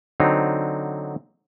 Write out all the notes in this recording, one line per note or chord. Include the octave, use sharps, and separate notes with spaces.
D3 F#3 C4 D#4